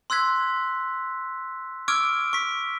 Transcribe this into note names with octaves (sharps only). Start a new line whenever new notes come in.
C6 E6 F#6 G#6 B6
C#6 D6 E6 F6 G#6 D7
C#6 B6